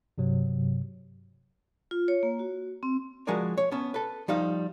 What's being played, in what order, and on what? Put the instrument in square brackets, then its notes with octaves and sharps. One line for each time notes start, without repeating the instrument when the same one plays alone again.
[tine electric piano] G2 C3 F#3
[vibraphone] F4
C#5
A#3
F#4
C4
[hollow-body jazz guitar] F3 G#3 F#4 G#4 A#4 D5
C#5
B3 C#4 A5
A4 B4
F3 G3 D#4 F5